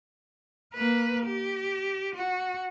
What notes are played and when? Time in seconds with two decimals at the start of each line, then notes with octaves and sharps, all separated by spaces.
0.74 A#3 B4
1.26 G4
2.15 F#4